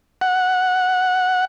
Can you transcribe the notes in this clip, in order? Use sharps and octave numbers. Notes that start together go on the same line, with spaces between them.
F#5